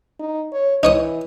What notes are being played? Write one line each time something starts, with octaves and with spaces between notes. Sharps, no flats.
D#4
C#5
E3 D#4 C#5 D#6